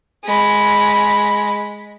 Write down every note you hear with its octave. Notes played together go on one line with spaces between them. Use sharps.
G#3 B5